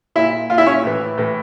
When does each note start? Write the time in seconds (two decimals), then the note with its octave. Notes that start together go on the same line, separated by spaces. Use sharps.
0.15 A#2 E4 E5
0.49 A#2 F4 F5
0.58 E4 E5
0.66 C#4 C#5
0.83 A2 E3
1.17 A2 E3